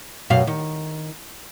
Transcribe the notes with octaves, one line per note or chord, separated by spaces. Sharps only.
F#2 B2 F5
D#3